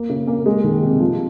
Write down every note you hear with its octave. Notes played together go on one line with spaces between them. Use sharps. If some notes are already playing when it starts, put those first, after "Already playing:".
Already playing: A#3
C#3
A#3
G#3
D#3
C3
F3